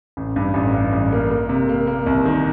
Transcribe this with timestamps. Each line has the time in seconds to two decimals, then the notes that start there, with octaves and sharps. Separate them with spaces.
0.17 A1
0.36 G2
0.54 A1
0.74 G2
0.93 A1
1.12 A#3
1.31 A#3
1.49 C3
1.69 A#3
1.87 A#3
2.06 C2
2.25 D#3